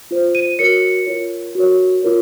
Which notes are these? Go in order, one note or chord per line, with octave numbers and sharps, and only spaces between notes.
F4 C5
D#7
F#4 A#4 C#5 C#7
F4 A#4 C#5
F#4 A#4 C#5
F4 A#4 C#5